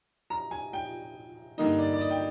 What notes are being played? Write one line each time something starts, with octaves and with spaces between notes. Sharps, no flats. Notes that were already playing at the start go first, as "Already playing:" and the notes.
A#5
G#5
G5
G2 D3 G3 A#3 D#4 D#5
D5
D5
D#5
G5